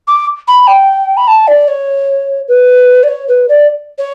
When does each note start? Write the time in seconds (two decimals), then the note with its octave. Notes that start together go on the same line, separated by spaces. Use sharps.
0.08 D6
0.48 B5
0.67 G5
1.17 B5
1.28 A5
1.48 D5
1.68 C#5
2.48 B4
3.03 D5
3.08 C#5
3.28 B4
3.49 D5
3.98 C#5